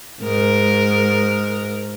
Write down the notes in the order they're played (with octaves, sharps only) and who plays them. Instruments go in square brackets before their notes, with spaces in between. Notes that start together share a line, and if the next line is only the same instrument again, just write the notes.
[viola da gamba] G#2 A#4